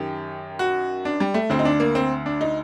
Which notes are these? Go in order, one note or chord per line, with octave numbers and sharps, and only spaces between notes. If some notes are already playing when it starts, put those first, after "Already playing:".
Already playing: F#2 D#3 G4
F#4
D4
G3
A3
D2 D3 C4
D#4
D4
A#3
C4
D4
D#4